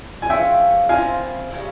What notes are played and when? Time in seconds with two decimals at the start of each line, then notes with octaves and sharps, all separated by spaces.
0.22 G#5
0.29 F3 G#3 C#4 F4 E5 G5
0.89 A#2 F3 C4 E4 F5 G#5
1.50 C#3 G3 A#3 E4